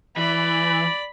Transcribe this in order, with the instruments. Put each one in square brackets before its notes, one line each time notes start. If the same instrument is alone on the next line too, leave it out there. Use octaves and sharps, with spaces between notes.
[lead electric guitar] E3 [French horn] D5 [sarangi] B5